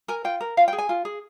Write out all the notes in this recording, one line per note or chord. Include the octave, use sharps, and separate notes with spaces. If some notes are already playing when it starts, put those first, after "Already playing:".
A#4 G#5
F4 G5
A#4
F4 F5
G5
G#4
G#5
F4
G#4